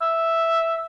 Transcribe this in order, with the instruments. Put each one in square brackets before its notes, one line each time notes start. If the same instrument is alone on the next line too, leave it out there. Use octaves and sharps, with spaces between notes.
[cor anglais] E5